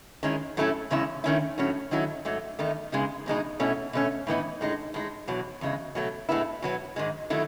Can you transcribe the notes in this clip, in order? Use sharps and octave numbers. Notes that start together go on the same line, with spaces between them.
D#3 G#3 C#4 E4
A2 F#3 A3 C#4 E4
E2 C#3 G#3 C#4 E4
D#3 A3 C#4 E4
A2 F#3 C#4
D#3 F#3 A3 C#4 E4
G#2 F#3 A3
E2 D#3 A3 D#4
C#3 G#3 B3 D#4
E2 B2 G#3 D#4
B2 A3 C#4 E4
B2 A3 C#4
A2 E3 B3 D#4
A2 G#3 D#4
A2 G#3 D#4
E2 B2 F#3
E2 C#3 G#3
B2 F#3 A3
A2 G#3 B3 E4
B2 F#3 B3
G#2 D#3 G#3
D#3 F#3 A3 E4